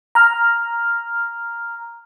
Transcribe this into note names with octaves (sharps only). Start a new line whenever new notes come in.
A#5 F6